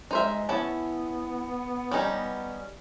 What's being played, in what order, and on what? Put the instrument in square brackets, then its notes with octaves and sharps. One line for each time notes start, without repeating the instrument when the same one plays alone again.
[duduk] G#3 [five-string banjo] D#4 C5 E5
[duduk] B3 [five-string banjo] C#4 E4 A5
[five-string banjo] G3 C#4 D#4
[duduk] B3